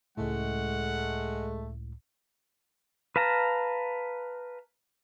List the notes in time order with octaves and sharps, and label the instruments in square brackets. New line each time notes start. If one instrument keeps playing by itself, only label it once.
[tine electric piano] C#2 A2 [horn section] G#3 A3 [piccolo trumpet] F#5
[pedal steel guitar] B4 F5 A5 A#5